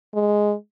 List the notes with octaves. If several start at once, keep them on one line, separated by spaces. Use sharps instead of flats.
G#3